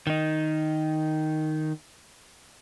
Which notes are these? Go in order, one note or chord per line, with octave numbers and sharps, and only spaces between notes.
D#3 D#4